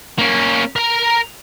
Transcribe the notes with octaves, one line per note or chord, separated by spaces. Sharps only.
A#3 C#4
A#4 A#5